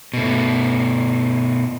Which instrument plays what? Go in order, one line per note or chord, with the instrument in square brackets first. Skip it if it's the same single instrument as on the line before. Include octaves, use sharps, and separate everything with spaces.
[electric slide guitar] B2 A3